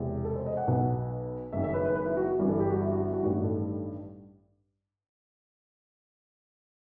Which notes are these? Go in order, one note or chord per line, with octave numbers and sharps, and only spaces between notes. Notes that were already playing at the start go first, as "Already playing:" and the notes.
Already playing: E1 E2 C3
A4
C5
D#5
F#5
B1 B2 F#5
F#1 F#2 D#3 E5
E5
B4
B4
B4
E4
F#4
F#4
G1 G2 E3
A4
G4
F#4
E4
F#4
E4
F#4
A1 G2 D#3 F#4
A4